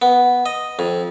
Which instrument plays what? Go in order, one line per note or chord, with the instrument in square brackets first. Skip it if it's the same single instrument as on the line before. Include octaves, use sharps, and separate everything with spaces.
[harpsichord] B3
D#5
F2